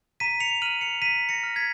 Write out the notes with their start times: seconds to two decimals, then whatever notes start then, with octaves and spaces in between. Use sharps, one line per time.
0.20 A#5 B6 D#7
0.40 C#7 F7
0.62 F6 D#7 F#7
0.81 C#7 F7
1.02 A#5 B6 D#7
1.29 A#6 C#7
1.43 F6
1.56 G#6 B6